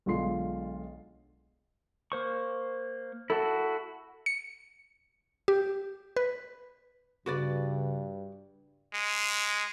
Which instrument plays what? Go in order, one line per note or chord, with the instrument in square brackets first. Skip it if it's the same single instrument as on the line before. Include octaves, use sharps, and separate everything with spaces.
[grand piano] B1 D3 G#3 F4 C6 C7
[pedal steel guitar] A#3 C5 C#6
[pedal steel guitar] E4 F#4 [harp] A4
[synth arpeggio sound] C#7
G4
B4
[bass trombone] G2 [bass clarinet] C#3 [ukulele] F#4 B4 D5
[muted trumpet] G#3